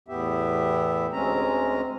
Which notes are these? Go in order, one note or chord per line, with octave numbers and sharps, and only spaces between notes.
E2 A2 B3 G4 E5
D2 G#3 C4 C#4 A#5